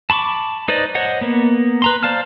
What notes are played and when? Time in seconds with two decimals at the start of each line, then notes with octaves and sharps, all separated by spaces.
0.10 A5 B5 C#6 D6
0.68 D#4 B4 C5 D5 D#5
0.95 C5 C#5 D#5 F#5
1.21 A#3 B3
1.82 B4 A#5 C6
2.03 C5 D5 F5 A5 F6